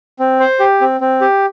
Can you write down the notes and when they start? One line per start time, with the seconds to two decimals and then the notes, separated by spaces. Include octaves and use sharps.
0.19 C4
0.40 C5
0.60 G4
0.81 C4
1.01 C4
1.21 G4